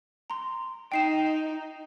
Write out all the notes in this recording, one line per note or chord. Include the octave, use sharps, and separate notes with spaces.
A#5 C6
D#4 G5 C7 E7